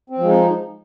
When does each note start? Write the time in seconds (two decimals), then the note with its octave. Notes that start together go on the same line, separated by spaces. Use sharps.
0.10 C4
0.19 F3 G#3
0.29 D#4